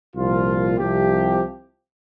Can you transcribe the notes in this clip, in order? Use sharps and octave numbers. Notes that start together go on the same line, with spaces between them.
C2 A#2 F3 F4
C2 C3 F3 G4